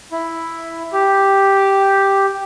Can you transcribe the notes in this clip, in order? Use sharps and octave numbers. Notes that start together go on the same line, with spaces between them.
E4
G4